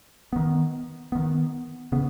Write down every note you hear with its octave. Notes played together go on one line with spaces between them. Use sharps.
D#3 B3
D#3 B3
C#3 B3